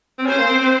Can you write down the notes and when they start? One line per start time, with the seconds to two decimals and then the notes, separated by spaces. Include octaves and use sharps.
0.18 C4
0.26 C#4 C5
0.38 A#3
0.47 C4
0.58 C4